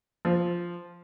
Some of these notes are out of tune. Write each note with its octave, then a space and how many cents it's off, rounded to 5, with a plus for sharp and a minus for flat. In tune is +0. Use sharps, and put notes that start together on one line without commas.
F3 +0